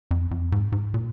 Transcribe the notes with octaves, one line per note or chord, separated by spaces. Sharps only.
F2
F2
G#2
G#2
A#2